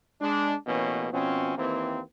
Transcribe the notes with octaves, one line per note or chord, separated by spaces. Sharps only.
G#3 D4
A1 B2 E3 A#3 C#4
B2 F3 C4 C#4
D#2 E3 A#3 C4